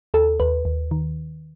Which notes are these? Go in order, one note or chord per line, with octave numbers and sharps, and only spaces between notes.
D#2 A4
D#2 B4
D#2
D#3